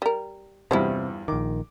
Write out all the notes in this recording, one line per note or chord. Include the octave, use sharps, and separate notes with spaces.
G3 A#4
E2 G2 C3 F3 F#3 E4
A#1 D#3 D6